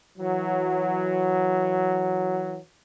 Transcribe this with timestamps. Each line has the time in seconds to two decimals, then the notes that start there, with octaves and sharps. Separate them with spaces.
0.18 E3 F#3